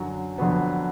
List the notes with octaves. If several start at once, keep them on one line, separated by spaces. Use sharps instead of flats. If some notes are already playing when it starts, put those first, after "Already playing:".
Already playing: F#2 D3 F#3
F2 D3 F#3 B3